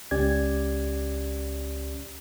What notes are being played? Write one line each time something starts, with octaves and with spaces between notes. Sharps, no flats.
C#2 C#4 G4 D5 G#6